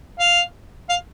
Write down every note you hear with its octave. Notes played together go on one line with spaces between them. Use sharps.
F5
F5